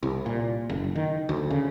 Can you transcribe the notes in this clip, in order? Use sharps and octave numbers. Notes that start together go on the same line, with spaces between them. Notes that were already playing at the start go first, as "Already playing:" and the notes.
C2
A#2
F#1
D#3
D2
C#3